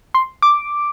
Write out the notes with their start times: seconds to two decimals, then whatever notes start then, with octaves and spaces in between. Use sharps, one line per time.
0.14 C6
0.42 D6